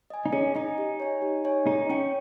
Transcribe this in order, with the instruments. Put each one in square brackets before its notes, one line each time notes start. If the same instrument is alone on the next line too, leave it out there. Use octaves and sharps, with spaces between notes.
[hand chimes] D#5 G#5
[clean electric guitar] D#4
[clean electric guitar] C#4 [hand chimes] G#4
[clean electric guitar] D#4 [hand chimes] D#5 G#5
[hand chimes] G4
C#5 G#5
G4
C#5 G#5
[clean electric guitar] D#4 [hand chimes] G#4
[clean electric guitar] C#4 [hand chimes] C#5 G5